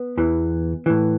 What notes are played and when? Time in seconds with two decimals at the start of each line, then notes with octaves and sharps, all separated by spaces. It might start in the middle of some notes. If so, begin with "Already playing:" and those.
Already playing: B3
0.18 E2 E3
0.86 A2 E3